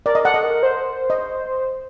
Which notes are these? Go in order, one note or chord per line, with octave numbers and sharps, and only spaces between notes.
A#4 D5
D#5
A4 F#5
D#5
A#4
C5
D#5